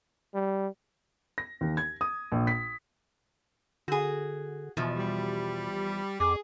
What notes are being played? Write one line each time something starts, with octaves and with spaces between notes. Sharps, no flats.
G3
A#6
D#2
G#6
D#6
A#1
B6
D3 F#4 G#4
E2 B2 F3
G3
F2 G#4 D6